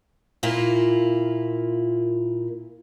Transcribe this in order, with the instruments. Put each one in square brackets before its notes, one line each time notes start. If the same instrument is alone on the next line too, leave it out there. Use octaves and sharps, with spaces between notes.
[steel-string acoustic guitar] A#2 A#3 E4 F4